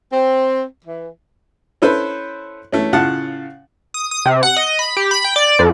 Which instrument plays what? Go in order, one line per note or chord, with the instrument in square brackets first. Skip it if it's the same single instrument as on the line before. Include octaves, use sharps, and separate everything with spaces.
[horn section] C4
E3
[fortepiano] C#4 E4 A4 B4 C5
E3 A3 C#4
A2 C#3 F4 F#5 A5
[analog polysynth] D#6
D#6
C3
F#5
D#5
B5
G4
B5
G5
D5
F2